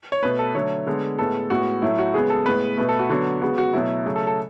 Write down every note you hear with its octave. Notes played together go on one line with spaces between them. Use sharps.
C#5
B2 A3 B4
A4
D3 F#3 A3 C#5
D3 G#3 B3
A2 G#3 B3 A4
A2 G#3 B3 F#4
A2 F#3 A3 E4
F#4
C#3 G#3 B3 G#4
A4
A2 G#3 B3 B4
B2 A3 B4
A4
F#4
D3 F#3 B3 F#4
C#3 G#3 B3 F#4
F#4
B2 F#3 A3 E4
C#3 F#3 A3
A4
A4